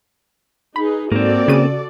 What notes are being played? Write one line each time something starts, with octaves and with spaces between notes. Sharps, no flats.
D#4 G#4 B4 B5
G#2 A#3 C4 F#4 A4 D5
C#3 D#7